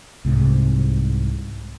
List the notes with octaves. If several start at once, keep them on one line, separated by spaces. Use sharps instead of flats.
C2 G#2 C3